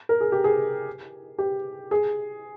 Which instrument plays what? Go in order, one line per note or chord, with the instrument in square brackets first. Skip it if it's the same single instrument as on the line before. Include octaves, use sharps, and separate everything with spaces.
[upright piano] A#4
G#4
G4
G#4
G4
G#4